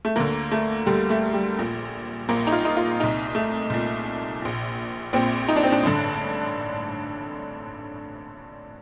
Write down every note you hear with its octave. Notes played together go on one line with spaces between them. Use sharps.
A3
D2 D3 A#3
A3
D2 D3 G3
A3
G3
A#1 A#2
A#1 A#2 A#3
D#4
F4
D#4
F4
C2 A#2 D#4
A3
C2 A#2
A#1 A#2
A#1 A#2 C4
D#4
D4
C4
D4
A1 G2 D3